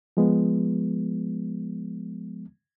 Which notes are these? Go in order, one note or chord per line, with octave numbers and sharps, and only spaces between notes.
F3 G#3 B3